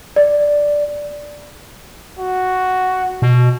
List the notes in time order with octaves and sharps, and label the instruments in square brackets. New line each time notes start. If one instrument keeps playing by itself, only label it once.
[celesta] D5
[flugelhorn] F#4
[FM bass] B2